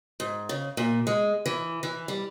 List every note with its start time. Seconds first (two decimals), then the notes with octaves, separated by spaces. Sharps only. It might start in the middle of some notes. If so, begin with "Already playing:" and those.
0.20 G#2
0.49 C#3
0.77 A#2
1.07 G#3
1.46 E3
1.83 E3
2.08 G3